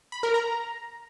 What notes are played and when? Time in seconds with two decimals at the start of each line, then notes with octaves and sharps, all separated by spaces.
0.12 B5
0.23 A#4
0.34 A#5